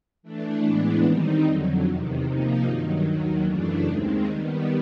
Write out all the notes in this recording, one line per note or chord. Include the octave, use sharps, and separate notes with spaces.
E3 A3 D4
A2 E3 G#3 B3 D4
D#3 G3 C4 D#4
F2 D3 F#3
E2 C3 D#3
C3 F3 A#3 D#4
G2 D#3 F#3
D#2 D#3 F#3
F#2 C#3 E3 A3 D4
D#2 D#3 G#3 C4
D#3 G3 B3